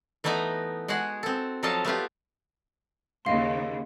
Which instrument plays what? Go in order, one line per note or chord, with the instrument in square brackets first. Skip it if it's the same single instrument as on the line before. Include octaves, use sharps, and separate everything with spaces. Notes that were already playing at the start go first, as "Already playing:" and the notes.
[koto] E3 A3 B3 D#4 D#5 A#5
G#3 F#4 G#4 F#5
C4 A4
F3 F#3 A4 D#5 F5 A5
A3 B3 F4 G4
[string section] D#2 C#3 [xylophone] D#5 F5 C6